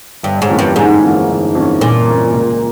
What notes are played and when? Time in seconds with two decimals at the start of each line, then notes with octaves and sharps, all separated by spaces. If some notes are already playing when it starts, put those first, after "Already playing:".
0.23 G1 G2
0.42 G#2
0.50 F2 E3 A#3 C#4
0.59 G2
0.76 G1 G#2
1.02 F2 E3 A#3 C#4
1.29 G1
1.55 F2 E3 A#3 C#4
1.81 G1 A#2
2.08 F2 E3 A#3 C#4
2.34 C#2